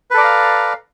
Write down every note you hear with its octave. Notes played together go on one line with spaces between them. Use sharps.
A4 B4 D5 F5 A#5